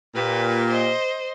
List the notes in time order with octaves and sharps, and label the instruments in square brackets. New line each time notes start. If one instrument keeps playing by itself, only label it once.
[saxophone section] A#2 G4 [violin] B4
[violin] C5 D#5